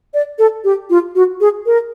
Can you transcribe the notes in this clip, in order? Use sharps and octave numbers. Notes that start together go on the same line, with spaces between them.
D5
A4
G4
F4
F#4
G#4
A#4